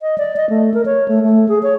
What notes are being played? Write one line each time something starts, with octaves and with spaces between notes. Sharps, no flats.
D#5
D5
D#5
A3
A#4
C#5
A3
A3
G#4
C#5